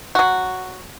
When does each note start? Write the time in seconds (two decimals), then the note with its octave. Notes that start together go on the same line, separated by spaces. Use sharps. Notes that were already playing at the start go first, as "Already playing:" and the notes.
0.15 F#3 F#4